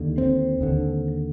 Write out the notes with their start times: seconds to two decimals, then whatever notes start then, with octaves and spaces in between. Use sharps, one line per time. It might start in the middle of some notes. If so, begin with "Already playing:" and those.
Already playing: D#2 D3
0.18 C4
0.61 D#2 D3